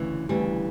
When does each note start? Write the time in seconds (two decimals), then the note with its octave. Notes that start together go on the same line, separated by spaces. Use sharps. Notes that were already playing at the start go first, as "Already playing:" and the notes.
Already playing: D2 C#3 E3
0.29 D2 C#3 E3 G3